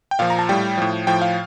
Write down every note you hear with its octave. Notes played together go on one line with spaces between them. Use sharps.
G5
A#2 F3 F5
A#5
A5
A2 G3 G5
A2 F3
A2 F3 G5
F5